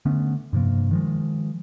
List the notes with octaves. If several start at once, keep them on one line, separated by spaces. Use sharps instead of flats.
D3 A3 B3 C#4
G2 C3 F3 A#3
D#3 F3 G#3